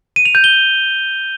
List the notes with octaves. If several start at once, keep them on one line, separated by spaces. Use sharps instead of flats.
D#7
F7
G6
G7